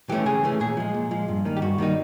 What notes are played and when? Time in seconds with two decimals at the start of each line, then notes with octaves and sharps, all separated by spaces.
0.09 E3 A3 C#4 G4
0.26 C#3 G#4
0.44 E3 A3 C#4
0.60 A#2 G#4
0.77 F3 G#3
0.94 A#2
1.11 F3 G#3
1.28 G2
1.45 D#3 G3 A#3 D#4
1.57 G4
1.62 G2 F#4
1.78 D#3 G3 A#3 D#4